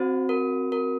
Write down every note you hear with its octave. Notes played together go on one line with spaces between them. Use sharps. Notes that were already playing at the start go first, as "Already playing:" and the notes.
Already playing: C4 F#4 C5
A#4
A#4